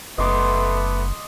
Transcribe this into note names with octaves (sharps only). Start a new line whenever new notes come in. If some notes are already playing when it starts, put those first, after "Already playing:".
F#1 A3 B3 D#5 C6 D6